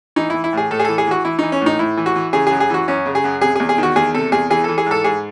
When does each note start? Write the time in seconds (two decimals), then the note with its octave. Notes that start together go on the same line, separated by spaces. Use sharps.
0.16 E3 D#4
0.30 E3 E4
0.44 E4
0.53 A2 G#4
0.71 A2 A4
0.79 G#4
0.85 E3 A4
0.98 G#4
1.07 E3 F#4
1.25 E3 E4
1.39 E3 D#4
1.52 C#4
1.61 A2
1.66 D#4
1.79 A2 E4
1.97 E3
2.06 F#4
2.16 E3
2.33 C#3 G#4
2.47 G#4
2.51 F#2
2.60 G#4
2.70 E3 F#4
2.88 F#2 C#4
3.06 C#3
3.15 G#4
3.24 F#2
3.41 C3 G#4
3.56 E2 G#4
3.69 G#4
3.78 D#3 F#4
3.96 E2 G#4
4.14 C3 A4
4.32 E2 G#4
4.50 E3 G#4
4.64 E3 A4
4.78 G#4
4.86 G#2 A4
5.04 G#2 G#4